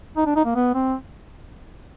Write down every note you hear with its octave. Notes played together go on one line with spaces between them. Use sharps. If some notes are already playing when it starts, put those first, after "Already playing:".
D#4
D4
D#4
A#3
B3
C4